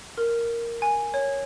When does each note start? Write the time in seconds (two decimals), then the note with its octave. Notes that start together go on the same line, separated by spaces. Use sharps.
0.18 A#4
0.82 G#5
1.14 C#5